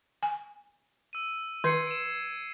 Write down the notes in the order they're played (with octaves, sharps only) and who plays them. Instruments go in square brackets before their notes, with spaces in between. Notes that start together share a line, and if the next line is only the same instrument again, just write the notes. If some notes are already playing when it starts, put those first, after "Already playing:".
[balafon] G#5
[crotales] E6 D#7
[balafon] D#3 B4 [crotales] G#6 C7 C#7
[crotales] D7 E7